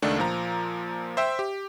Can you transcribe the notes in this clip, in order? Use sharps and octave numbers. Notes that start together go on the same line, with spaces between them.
C#2 D#3 A3 D4
A#2 F3 A#5
C5 E5 G5
G4